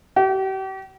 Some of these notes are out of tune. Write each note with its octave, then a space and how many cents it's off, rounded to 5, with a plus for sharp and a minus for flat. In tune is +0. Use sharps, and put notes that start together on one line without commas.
G4 -40